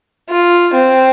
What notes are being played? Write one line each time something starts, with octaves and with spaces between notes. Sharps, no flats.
F4
C4